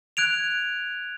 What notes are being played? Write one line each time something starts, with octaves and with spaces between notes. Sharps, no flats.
F#6 G#6 D7 F7